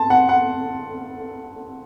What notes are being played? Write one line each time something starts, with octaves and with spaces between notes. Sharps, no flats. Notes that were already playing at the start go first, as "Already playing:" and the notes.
Already playing: A5 C6
F#5
F#5